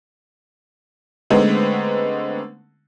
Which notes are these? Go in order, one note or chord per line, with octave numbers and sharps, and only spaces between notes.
D3 G#3 A3 B3 C4 D#4